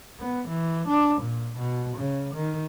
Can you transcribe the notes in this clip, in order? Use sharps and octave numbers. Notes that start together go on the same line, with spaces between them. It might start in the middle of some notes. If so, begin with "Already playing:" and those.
B3
E3
D4
A#2
B2
C#3
D#3